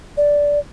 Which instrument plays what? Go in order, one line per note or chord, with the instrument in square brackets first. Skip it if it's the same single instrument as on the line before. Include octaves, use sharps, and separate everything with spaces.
[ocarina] D5